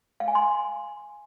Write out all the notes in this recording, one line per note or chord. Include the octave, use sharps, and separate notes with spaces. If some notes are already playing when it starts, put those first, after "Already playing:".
F5
G#5
C6